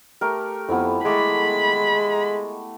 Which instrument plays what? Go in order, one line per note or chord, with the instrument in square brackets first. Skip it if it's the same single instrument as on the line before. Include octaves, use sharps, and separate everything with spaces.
[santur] A3 G4 A#4
[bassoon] F2 [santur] B3 E4
[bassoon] G#3 [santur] A3 A4 D6 [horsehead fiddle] B5